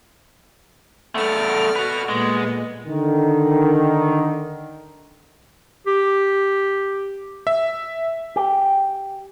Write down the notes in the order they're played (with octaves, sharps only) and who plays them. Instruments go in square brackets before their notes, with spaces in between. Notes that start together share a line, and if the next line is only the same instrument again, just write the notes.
[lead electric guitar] A3 B3 [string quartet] A4 D5 F6
[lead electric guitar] F#4 B4
[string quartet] A#2 B3 [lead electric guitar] G#3
[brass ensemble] D3 D#3
[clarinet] G4
[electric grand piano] E5
[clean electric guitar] G4